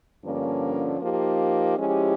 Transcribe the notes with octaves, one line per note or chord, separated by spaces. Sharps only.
G2 D3 F3 A#3 C#4
F3 A#3 D#4 G4
F3 G#3 C#4 E4 G4